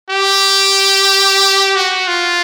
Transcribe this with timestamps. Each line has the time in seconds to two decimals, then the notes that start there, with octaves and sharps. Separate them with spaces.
0.10 G4
1.76 F#4
2.08 F4